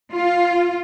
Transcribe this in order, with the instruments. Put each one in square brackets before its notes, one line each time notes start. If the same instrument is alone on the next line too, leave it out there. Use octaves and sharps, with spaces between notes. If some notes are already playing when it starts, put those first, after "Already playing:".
[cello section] F4